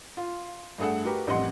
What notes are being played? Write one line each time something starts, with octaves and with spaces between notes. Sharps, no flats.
F4
G2 A3 G#4 A4 F#5
F#4 G4 A#4 B4
A1 F2 G3 D#5 F#5 C6